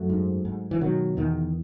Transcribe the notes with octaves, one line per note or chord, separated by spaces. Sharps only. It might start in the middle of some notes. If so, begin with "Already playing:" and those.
Already playing: F#2 F#3 A3
G#2
G#2
E3
B2 D#3 F#3
E2 D#3